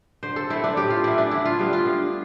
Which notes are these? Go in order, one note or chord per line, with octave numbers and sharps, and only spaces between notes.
D3 C5
A4
A3 C4 E4
D4
A2 G4
F4
E3 B3 E4
D4
D3 E4
F4
G3 B3
F4
D3